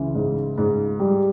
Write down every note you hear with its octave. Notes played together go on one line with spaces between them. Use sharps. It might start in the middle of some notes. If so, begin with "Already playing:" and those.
Already playing: C#2 C#3 E3
G#2
G#2
G3